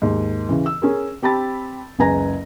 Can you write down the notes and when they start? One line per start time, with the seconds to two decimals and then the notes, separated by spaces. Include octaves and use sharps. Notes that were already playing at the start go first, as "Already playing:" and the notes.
0.02 D#2 G#2
0.49 C#3 E3
0.66 E6
0.82 C#4 G#4 A#4
1.22 C4 G4 A5 B5 A6
1.99 F#1 C#2 B4 G#5 A#5 A#6